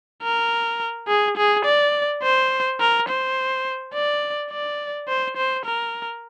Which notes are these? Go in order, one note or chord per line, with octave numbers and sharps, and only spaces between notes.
A#4
G#4
G#4
D5
C5
A#4
C5
D5
D5
C5
C5
A#4